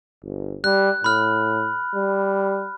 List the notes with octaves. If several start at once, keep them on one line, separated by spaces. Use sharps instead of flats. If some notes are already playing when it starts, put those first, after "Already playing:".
G1
G3 F#6
A2 B5 F6
G3